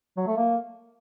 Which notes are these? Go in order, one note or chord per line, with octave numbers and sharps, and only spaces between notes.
F#3
A3
A#3